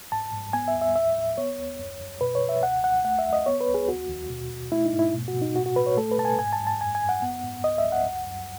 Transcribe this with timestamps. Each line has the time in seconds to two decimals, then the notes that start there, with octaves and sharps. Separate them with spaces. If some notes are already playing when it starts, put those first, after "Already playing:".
0.12 G#2 A5
0.33 G#2
0.53 B3 G#5
0.68 E5
0.75 D#2
0.82 E5
0.96 A2 E5
1.17 A2
1.37 B3 C#5
1.59 D#2
1.79 F#2
2.00 F#2
2.21 B2 B4
2.35 C#5
2.42 B2
2.49 E5
2.63 C#2 F#5
2.84 C#2 F#5
3.04 A3 F#5
3.19 E5
3.25 D#2
3.33 D#5
3.46 B3 C#5
3.61 B4
3.68 C#2
3.74 G#4
3.88 D#2 F#4
4.09 D#2
4.30 B2
4.51 B2
4.72 A3 E4
4.86 D#4
4.93 G#2
4.99 E4
5.14 B2
5.28 F#4
5.35 B2
5.41 D#4
5.55 A2 F#4
5.66 F#4
5.76 A2 B4
5.87 C#5
5.97 A3 A4
6.11 B4
6.18 B2 A5
6.25 G#5
6.39 G#2 G#5
6.53 A5
6.60 G#2
6.67 A5
6.81 F#2 G#5
6.95 G#5
7.02 F#2
7.09 F#5
7.22 B3
7.43 G#2
7.64 C#2 D#5
7.78 E5
7.85 C#2
7.92 F#5
8.07 F#2
8.27 F#2